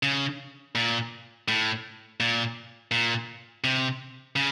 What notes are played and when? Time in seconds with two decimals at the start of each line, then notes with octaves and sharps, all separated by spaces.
0.03 C#3
0.75 A#2
1.48 A2
2.20 A#2
2.91 A#2
3.64 C3
4.36 C#3